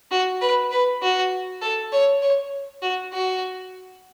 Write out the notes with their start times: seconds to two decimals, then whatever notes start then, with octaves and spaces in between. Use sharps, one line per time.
0.11 F#4
0.41 B4
0.71 B4
1.02 F#4
1.62 A4
1.92 C#5
2.22 C#5
2.82 F#4
3.13 F#4